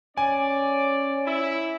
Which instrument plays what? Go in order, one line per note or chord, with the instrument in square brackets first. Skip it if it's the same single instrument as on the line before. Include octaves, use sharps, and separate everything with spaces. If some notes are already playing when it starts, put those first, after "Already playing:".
[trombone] C#4 [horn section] D5 [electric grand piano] G#5
[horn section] E4